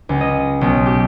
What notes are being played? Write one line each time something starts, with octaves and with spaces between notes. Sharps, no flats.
C#2
D#5
B1
G4